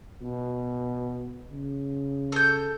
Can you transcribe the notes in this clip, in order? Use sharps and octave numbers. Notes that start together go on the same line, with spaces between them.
B2
C#3
A4 G6